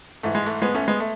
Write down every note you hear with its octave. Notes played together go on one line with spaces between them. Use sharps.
G#2 E3 A3
G#3
A3
G#3 B3
A3 C#4
G#3 B3
A3